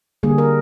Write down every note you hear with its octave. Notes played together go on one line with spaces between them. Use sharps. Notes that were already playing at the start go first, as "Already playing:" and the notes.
D3 G3 A#3 G#4
A#4